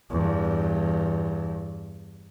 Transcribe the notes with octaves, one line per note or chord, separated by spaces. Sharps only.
E2 G2